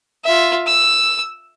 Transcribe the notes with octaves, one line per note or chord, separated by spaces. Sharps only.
F4 E5
E6